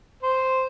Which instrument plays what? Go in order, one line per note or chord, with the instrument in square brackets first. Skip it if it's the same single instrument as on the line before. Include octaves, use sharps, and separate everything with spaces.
[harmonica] C5